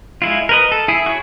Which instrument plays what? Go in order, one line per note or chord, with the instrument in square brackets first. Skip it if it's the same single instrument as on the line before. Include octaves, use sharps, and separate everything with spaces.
[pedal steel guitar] G#3 E4 F4
A#4 B4 D#5
A4
E4 G#4
F#4 C#5